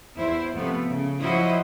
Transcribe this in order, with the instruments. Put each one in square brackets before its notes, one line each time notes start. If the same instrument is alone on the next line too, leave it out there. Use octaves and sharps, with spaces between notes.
[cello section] E2 E4 C5
C3 F3 A3 B3
C#3
F3 F#3 E4 F#4 C5 D#5